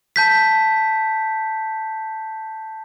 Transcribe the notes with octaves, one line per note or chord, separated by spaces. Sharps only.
A5 G6 B6